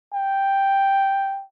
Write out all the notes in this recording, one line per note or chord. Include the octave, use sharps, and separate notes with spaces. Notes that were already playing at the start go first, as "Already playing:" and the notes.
G5